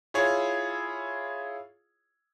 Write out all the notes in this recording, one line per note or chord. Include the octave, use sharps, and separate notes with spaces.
E4 F4 G#4 C#5